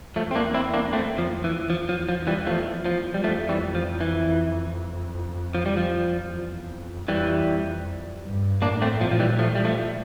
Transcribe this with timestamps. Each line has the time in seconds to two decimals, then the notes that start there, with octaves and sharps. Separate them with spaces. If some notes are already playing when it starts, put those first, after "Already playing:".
0.16 E2 F3 A3
0.31 C4
0.35 A#3 D4
0.54 C4 E4
0.74 A#3 D4
0.93 F2 A3 C4
1.18 F3
1.31 E2
1.44 E3
1.70 E2 F3
1.89 F3
2.09 F3
2.27 E3 G3
2.47 F3 A3
2.86 F3
3.14 G3
3.24 F2 F3 A3
3.49 E3 G3
3.75 F3
4.01 E3
5.55 F3
5.66 G3
5.77 F3
6.31 E2
6.70 F2
7.08 F2 E3 G3
7.46 F2
8.24 G2
8.62 A2 A#3 D4
8.82 A3 C4
9.01 A#2 F3
9.11 F3
9.20 E3 G3
9.39 F3 A3
9.55 G3
9.65 F3 A3